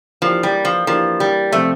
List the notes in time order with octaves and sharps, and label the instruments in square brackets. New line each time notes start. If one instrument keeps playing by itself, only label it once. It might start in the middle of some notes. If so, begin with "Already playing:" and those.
[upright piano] E3 A#3 D4 G4 A#4 [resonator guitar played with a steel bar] F3
[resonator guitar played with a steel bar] G3
F3
[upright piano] E3 A#3 D4 G4 A#4 [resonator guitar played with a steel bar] F3
[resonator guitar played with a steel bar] G3
[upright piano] C3 F3 C4 [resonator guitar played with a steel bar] A3